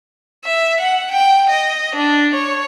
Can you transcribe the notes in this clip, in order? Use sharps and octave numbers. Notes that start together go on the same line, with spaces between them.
E5
F#5
G5
D#5
D4
C#5